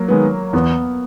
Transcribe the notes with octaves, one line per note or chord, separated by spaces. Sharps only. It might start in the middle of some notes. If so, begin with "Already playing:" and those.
Already playing: F#3 A#3
D#3 G#3 B3
E2 B3